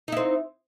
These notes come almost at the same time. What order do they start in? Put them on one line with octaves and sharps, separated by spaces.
D#4 E4 C4